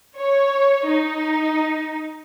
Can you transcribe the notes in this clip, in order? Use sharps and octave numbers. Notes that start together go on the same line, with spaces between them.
C#5
D#4